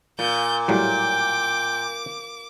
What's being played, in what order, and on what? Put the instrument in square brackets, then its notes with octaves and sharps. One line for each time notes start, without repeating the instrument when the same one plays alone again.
[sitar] A#2 [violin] G6
[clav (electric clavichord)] A2 F#3 G3 [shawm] G5 [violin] D6